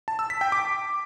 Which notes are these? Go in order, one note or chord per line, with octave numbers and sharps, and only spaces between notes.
A5
E6
B6
G5
D6